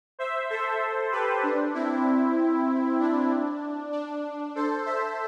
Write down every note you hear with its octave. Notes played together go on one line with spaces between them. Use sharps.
C5 E5
A4 C5
G4 B4
D4
C4 E4
D4
D4
A4 C5
C5 E5